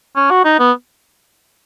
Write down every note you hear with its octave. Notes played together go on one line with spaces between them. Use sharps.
C#4
F#4
D#4
B3